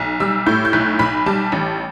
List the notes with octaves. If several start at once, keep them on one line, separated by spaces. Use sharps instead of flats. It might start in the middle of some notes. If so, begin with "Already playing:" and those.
Already playing: B1
G3 E6
A2 G6
G6
B1 F#6
B1 B5
G3 A5
A1